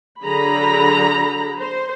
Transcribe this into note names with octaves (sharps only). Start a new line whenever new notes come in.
D3 F#3 G#4 A#5 B5
C5